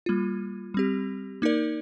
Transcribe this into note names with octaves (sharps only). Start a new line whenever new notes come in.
G3 A#3 F4
G3 C4 G4
A#3 D#4 A#4 D5